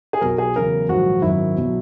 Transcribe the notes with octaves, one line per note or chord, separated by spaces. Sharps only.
G#4
B1 B2 F#3 A#4
G#4
E2 C#3 F#3 A#4
A#1 G#2 D#3 F#3 F#4
G#1 F#2 D#3 F#3 E4
B1 B2 F#3